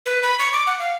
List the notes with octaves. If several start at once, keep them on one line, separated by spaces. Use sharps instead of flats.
B4
B5
C#6
D6
F#5
F5